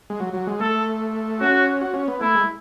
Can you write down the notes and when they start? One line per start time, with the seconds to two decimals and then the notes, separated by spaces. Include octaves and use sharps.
0.10 G#3
0.20 F#3
0.34 F#3
0.47 G#3
0.60 A3 A4
1.40 C#4 F#4
1.81 F#4
1.94 C#4
2.08 B3
2.21 A3 E4
2.35 G#3